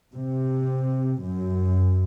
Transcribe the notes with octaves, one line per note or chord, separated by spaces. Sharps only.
C3
F#2